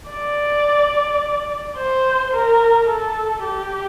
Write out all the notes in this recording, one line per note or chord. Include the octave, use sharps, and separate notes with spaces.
D5
C5
A#4
A4
G4